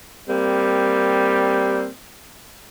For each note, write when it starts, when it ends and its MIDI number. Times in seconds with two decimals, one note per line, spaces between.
0.28 1.88 55
0.28 1.88 58
0.28 1.88 60